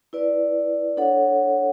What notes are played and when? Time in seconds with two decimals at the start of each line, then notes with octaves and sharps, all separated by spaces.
0.13 E4 B4 D5
0.97 D4 A4 C#5 F#5